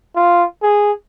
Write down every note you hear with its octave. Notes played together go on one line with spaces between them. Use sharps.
F4
G#4